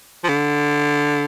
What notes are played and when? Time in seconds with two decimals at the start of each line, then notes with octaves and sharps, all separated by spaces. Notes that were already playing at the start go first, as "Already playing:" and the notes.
0.24 F3
0.29 D3